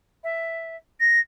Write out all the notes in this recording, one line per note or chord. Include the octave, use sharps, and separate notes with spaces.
E5
A#6